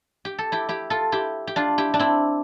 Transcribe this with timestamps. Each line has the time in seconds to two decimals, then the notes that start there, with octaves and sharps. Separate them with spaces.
0.25 G4
0.38 A4
0.52 E4 G4
0.69 E4 G4
0.90 F4 A4
1.12 E4 G4
1.47 G4
1.56 D4 F4
1.78 E4 G4
1.94 D4
1.99 C4 E4